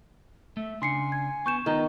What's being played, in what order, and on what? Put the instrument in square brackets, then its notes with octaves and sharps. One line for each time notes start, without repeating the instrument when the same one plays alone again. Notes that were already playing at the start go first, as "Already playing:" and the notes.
[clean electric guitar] A3 [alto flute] E5
[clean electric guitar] C#3 D4 [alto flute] G#5 [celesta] C6 C7 C#7
[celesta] G#6
[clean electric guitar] B3 [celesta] C#6 G6 E7
[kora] D#3 [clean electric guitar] B3 F4 D#5 [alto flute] A#5